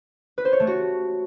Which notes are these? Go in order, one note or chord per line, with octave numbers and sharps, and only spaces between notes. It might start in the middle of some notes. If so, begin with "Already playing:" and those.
B4
C5
C#5
A3
F#4